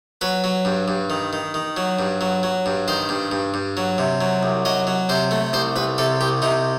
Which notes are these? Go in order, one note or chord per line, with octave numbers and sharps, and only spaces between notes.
F#3 B4
F#3
G2
G2
D#3
D#3
D#3
F#3
G2
F#3
F#3
G2
D#3 C5
G2
G2
G2
F#3
C3
F#3
C2
F#3 D#5
F#3
C3 C5
A3
C2 C5
C2 B4
C3 A4
C2 G4
C3 D#4